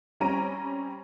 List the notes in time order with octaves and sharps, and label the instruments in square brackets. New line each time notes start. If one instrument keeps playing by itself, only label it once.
[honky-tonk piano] G3 C4 C#4 A#5 D7 D#7